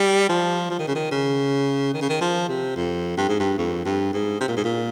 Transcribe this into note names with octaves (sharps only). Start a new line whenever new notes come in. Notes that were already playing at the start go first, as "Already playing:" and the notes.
Already playing: G3
F3
F3
D#3
C#3
D#3
C#3
D#3
C#3
D#3
F3
C3
F2
G2
G#2
G2
F2
G2
G#2
C3
A#2
G#2
A#2